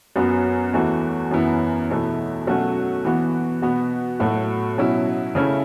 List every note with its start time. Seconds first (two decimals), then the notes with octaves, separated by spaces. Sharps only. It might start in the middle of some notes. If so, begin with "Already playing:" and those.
0.16 F#2 F#3 B3 F#4
0.73 E2 E3 A3 F#4
1.31 F#2 E3 B3 E4
1.89 E2 B2 A3 E4
2.47 B2 F#3 A3 C#4 F#4
3.05 E3 B3 F#4
3.62 B2 B3 F#4
4.19 A2 F#3 A3 F#4
4.78 B2 F#3 C#4 E4
5.35 C#3 A3 C#4 E4